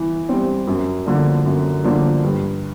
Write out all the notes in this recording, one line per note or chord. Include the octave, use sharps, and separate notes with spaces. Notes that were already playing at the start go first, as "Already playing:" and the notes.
Already playing: E3
G3 C4
F#2
D3 F3 A#3 D4
F#2
D3 F3 A#3 D4
G2